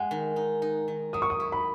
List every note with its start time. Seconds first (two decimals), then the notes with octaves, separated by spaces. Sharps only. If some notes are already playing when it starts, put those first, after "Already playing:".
Already playing: G#3 F#5
0.11 D#3
0.36 D#4
0.62 D#4
0.88 D#3
1.13 F#3 D#6
1.22 C#6
1.30 D#6
1.40 E4
1.52 B5